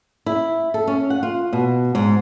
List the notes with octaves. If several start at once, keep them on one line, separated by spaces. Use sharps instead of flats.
E4
A4
C#4
F#5
F4
B2
G#2